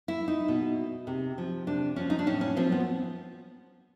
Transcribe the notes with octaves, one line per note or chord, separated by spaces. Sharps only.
E4
D#4
B2
C3
F3
C3 D4
F3 C#4
D#4
D4
A2 C#4
C#4
F3 C4
B3